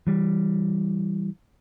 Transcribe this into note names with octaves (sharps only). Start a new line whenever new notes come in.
E3 G3